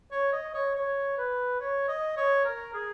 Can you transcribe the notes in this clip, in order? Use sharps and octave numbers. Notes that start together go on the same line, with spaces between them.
C#5
D#5
C#5
C#5
B4
C#5
D#5
C#5
A#4
G#4